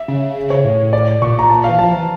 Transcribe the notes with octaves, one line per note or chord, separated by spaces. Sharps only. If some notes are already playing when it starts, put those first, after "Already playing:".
Already playing: E5
C#3
C#5
A2
D5
A#2 C#6
A#5
A5
E3 F5
F3 A5
E3